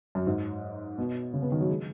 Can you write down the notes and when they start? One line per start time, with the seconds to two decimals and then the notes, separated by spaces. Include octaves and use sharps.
0.15 F#2
0.27 G#2
0.98 B2
1.33 C#3
1.42 B3
1.52 D#3
1.60 F#3
1.69 G#3